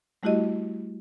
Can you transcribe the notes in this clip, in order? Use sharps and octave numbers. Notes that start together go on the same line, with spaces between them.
G3 A3 E4 F#4 G4 D#5